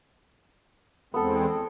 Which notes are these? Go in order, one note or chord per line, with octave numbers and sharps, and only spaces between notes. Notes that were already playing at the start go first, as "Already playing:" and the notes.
E2 G#3 B3 C4 A4